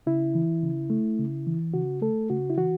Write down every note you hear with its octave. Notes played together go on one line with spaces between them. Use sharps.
C#3 E4
E3
C#3
A3
C#3
E3
C#3 F#4
A3 A4
C#3 F#4
E4
E3 F#4